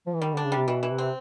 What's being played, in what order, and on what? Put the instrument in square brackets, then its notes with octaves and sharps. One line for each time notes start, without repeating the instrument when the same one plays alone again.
[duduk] F3
E3
[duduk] D#3 [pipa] G3
[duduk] D3 [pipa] D4
[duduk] C#3
[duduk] C3 [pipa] G3
[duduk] B2 [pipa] E3
[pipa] E3
[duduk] C3
[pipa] C4